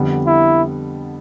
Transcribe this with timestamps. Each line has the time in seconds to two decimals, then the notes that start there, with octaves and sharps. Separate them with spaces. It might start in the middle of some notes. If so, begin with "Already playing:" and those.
Already playing: F2 D3 G3 B3
0.27 E4